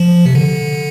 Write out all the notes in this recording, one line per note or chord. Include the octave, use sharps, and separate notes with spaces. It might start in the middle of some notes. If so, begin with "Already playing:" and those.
Already playing: F3
C3
D3